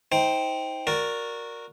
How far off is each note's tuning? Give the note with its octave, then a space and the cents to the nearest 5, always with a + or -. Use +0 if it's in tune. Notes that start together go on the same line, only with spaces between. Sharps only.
D#4 +35 C5 +0 G5 +0
F#4 -15 A#4 +0 D5 +0